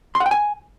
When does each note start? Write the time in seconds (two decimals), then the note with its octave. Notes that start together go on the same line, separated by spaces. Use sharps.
0.15 C6
0.20 F#5
0.26 G5
0.31 G#5